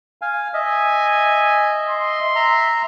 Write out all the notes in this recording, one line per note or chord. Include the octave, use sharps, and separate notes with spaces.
F5 G#5
D#5 E5 G#5
C6
E5 A#5